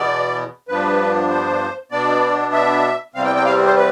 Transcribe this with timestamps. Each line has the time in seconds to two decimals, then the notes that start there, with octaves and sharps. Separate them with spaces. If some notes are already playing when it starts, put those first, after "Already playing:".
Already playing: E2 B2 B3 D5
0.68 G2 F3 B3 D4 B4
1.30 C5
1.91 B2 B3 D4 D5
2.53 E5
3.14 E2 C3 G3 C4 F5
3.25 G5
3.35 G5
3.45 F5
3.66 C5
3.76 B4